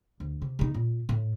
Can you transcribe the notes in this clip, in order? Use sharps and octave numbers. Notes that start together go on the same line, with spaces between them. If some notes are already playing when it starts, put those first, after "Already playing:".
D2
C3
C3 D#4
A#2
A2